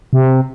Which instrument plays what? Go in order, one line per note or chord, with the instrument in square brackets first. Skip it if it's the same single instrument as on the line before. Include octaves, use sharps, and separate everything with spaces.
[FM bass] C3